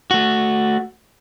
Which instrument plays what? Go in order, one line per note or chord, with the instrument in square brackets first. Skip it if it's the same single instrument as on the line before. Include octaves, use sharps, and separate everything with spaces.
[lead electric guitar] A3 F#4